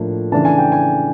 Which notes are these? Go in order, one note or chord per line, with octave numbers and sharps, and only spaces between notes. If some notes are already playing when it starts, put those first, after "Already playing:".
Already playing: A2 F3 A#3 D4
C#3 E3 A3 D4 A5
G#5
G5
G#5